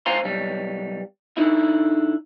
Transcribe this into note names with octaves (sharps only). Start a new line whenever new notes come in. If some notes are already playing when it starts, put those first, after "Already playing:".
G#2 C5 F5 G#5 A#5 C6
B1 G3
D3 D#4 E4